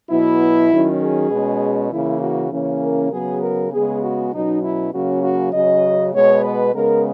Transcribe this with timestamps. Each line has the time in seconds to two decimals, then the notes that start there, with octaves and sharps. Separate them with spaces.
0.10 B2 F#3 B3 E4
0.71 D#3 F#3 C#4
1.01 G#4
1.30 B2 G#3 C#4
1.92 C#3 E3 A#3 E4
2.21 F#4
2.52 C#3 E3 A#3 C#4
2.83 A#4
3.12 C#3 F#3 B3 G#4
3.42 A#4
3.72 C#3 G#3 B3 G#4
4.02 F#4
4.33 B2 F#3 C#4 D#4
4.63 E4
4.93 C#3 F#3 A#3 C#4 F#4
5.23 F#4
5.53 C#3 F#3 C#4 D#5
6.14 B2 G#3 B3 C#5
6.44 B4
6.74 C#3 G#3 B3 A#4